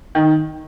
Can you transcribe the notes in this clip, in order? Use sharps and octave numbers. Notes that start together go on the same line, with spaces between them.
D#3